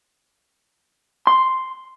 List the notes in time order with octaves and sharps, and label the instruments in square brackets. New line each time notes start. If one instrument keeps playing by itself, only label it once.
[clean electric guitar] C6